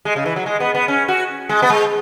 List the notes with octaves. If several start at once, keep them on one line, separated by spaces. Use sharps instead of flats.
G#3
C#3
E3
F#3
G#3
B3
B3
C#4
F#4
G#3
B3
G#3